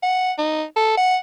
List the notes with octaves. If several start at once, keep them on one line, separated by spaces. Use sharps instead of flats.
F#5
D#4
A4
F#5